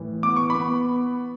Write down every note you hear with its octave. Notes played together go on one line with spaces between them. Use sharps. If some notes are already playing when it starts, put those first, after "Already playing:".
Already playing: A2 E3
B3 D6
C#6
B5
B3